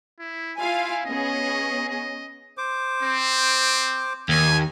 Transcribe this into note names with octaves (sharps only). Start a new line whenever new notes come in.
E4
E4 F4 F5 G#5
B3 C#4 G#4 D#5
D#5
C5 D6
C4
D#2 G#5